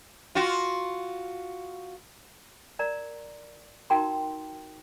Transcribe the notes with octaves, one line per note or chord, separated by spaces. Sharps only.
F4 F#4
A#4 D5 A#5
D#4 F#4 A#4 G5 A#5 C6